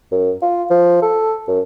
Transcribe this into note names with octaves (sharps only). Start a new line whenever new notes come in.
F#2
F4
F3
A4
F#2